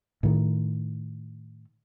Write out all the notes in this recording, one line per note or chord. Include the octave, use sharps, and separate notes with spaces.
A2 D#3